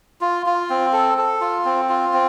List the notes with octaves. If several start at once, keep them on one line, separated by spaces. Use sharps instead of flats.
F4
F4
C4
A4
A4
F4
C4
F4
C4